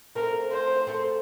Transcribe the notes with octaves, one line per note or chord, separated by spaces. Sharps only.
A3 C4 A#4
C5
A3 C4